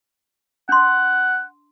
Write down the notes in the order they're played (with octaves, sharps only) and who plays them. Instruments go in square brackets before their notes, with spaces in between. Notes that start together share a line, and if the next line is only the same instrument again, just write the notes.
[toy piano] D4 C6 [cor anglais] F#5